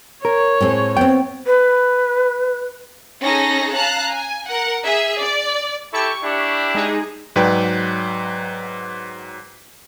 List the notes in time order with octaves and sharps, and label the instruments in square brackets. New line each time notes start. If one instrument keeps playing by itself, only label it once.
[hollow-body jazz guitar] A#4 [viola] C#5
[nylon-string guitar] A2 G#3 C4
[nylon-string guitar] B3 C4 [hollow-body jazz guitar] G5
[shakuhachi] B4
[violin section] C#4 D#4 G#4 A4 A#6
F5 A5 A#5 F#6
G#5
A#4 F#5
G#4 E5
D5
[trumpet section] E4 G4 A4 [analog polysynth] C#6
[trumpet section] D4 E4 G4
[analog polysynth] G#3 D#4 G#4
[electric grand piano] G#2 F#3 B4 D5 G5